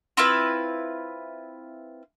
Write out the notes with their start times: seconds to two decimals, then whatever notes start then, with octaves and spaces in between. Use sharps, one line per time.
0.17 C4 E4 F4 B4